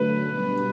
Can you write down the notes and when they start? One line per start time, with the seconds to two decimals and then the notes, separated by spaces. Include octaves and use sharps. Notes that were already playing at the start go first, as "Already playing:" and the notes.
Already playing: D3 F#3 A3 B4
0.26 B2 G3 B3 D4